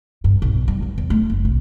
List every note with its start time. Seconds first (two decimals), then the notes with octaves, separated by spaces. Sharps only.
0.24 G2
0.42 B1
0.68 G3
0.82 G2
0.98 E2
1.10 A3
1.30 F#1
1.45 C2